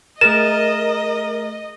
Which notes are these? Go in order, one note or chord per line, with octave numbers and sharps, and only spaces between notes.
A3 G#4 A#4 D#5 A6 E7